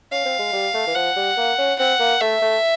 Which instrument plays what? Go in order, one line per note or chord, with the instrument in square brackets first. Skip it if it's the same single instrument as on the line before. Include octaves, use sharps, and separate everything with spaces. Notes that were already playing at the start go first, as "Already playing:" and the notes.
[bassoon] C#4 [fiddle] F5
[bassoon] C4
G#3
G3
A3
E3
[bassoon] F3 [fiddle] F#5
[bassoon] G3
A#3
C#4
[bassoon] C4 [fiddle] F#5
[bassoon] A#3
[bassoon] A3 [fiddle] E5
[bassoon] A3